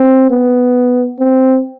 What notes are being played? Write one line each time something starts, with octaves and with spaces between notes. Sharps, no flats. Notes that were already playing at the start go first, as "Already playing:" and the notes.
Already playing: C4
B3
C4